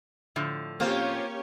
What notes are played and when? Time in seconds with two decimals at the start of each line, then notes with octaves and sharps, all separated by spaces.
0.36 A2 D3 F3
0.80 A#3 C4 C#4 F4 G4 C5 C#5